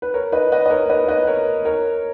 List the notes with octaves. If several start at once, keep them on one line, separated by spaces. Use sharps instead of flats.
B4
A#4 C#5
B4 D#5
B4 D#5
D#5
A#4 C#5
B4 D#5
B4 D#5
A#4 C#5
A#4 C#5